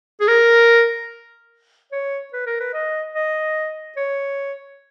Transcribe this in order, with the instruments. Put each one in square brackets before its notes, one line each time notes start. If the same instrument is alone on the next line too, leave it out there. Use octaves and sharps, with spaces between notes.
[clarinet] G#4
A#4
C#5
B4
A#4
B4
D#5
D#5
C#5